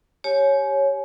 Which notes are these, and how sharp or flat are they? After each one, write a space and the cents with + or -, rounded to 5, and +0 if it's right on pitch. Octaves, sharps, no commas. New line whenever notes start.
G4 +5 C#5 -5 G#5 +30